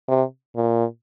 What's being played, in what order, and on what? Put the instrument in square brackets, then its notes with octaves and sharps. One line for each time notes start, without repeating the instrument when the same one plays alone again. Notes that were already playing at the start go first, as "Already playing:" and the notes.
[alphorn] C3
A#2